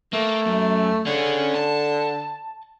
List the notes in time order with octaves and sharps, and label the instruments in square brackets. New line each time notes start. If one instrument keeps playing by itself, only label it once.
[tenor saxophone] A3 [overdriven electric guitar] A#3
[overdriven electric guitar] F#2
[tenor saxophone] D3 [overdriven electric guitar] C#4 G#4
[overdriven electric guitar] A5